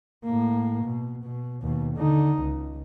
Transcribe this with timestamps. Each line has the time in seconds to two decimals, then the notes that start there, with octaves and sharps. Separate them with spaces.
0.25 A2 A#3
0.84 B2
1.24 B2
1.62 D#2 B2
1.96 D3 D#4
2.40 C#2